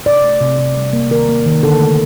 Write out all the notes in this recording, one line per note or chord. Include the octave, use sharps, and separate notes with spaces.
C3 D5
A3
C3
C3
G3
A#3
D#3 A#4
A#3
D#3
D3 A4
A3